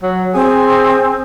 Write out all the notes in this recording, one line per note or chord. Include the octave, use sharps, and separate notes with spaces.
F#3
C4 G#4